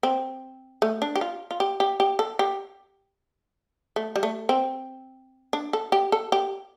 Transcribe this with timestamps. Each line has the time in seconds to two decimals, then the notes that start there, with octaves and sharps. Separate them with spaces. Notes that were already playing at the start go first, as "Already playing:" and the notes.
0.03 C4
0.82 A3
1.02 D4
1.15 G4
1.21 F4
1.51 F4
1.60 G4
1.80 G4
2.00 G4
2.19 A4
2.39 G4
3.96 A3
4.16 G3
4.23 A3
4.49 C4
5.53 D4
5.73 A4
5.92 G4
6.12 A4
6.32 G4